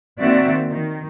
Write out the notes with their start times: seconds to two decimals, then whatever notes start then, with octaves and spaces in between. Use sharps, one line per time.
0.20 D#3 A#3 C4 F#4 D5 E5
0.69 D#3